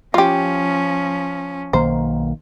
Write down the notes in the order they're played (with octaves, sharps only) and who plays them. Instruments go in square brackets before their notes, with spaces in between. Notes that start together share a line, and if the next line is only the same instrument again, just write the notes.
[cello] F3 C#4 [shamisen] F4 G4
[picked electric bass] B1 D#3 A#3 [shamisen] C5